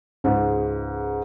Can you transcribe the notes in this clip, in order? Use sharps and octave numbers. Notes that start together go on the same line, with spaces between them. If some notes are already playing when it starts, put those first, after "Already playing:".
C#2 G#2